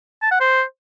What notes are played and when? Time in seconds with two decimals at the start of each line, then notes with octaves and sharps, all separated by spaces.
0.22 A5
0.31 F#5
0.40 C5